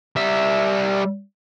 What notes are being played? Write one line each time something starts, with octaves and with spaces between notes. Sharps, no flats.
G3 E5